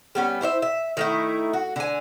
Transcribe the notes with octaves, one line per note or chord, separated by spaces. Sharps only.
G3 B3 C#4
E4 C5 C#5 E5
E5
D#3 A3 E4
F#4
D3 G#5